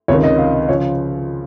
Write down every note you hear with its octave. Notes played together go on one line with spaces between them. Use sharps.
C#2 C3 D#3 C#5
D#5
F5
D#5
C#3 F3 C#5